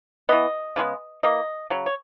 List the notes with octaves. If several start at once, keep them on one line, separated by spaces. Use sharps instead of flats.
E3 B3 D#5
C#3 E3 G#3 B3
E3 A#3 D#5
C#3 F#3
C#5